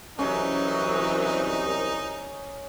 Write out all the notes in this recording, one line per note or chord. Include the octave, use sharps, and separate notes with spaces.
C2 E3 F#3 C#4 D#4